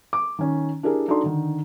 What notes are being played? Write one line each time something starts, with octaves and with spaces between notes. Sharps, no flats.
D6
D#3 C#4
D4 E4 G4 G#4 A#4
D4 D#4 F#4 A4 D5 C6
D3 D#3